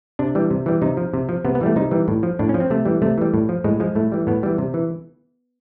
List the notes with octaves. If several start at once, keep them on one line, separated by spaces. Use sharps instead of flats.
C3 D4
E3 G3
C3
E3 G3
C3 D#4
F3
C3
F3
C3 B3
B3
E3 G3 A3
C3 D#4
E3 G3
A2
F3
A2 D4
C#4
F3
C4
C3 A3
E3 G3
C3 A3
E3 G3
A2
F3
A2 G#3
F3 G#3
A2 A3
E3 G3
A2 B3
E3 G3
C3
E3